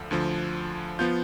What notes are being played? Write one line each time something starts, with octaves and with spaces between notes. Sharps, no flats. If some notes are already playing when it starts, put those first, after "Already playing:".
Already playing: D2 D3 F3
D2 D3 F3
F3 B3 F4 G6